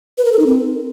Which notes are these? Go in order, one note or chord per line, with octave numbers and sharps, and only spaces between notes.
B4
A#4
A4
D#4
C4